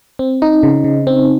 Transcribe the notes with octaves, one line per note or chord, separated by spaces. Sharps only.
C4
D#4
C#3
C#3
C4